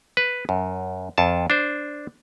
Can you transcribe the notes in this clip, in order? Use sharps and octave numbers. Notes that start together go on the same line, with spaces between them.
B4
F#2
F2 A5
D4 C5